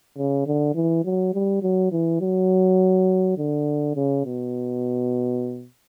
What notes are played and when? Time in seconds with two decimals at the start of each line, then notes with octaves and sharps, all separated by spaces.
0.17 C#3
0.46 D3
0.75 E3
1.05 F#3
1.34 G3
1.62 F#3
1.92 E3
2.21 F#3
3.38 D3
3.96 C#3
4.25 B2